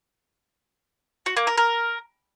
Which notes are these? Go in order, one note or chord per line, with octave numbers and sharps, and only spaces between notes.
F#4
A#3
A#4
A#4